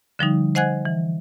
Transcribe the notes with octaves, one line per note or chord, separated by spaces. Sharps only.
D3 F3 G3 D#4
C5 D#5 F#5 G#5 F#6 G#6
E3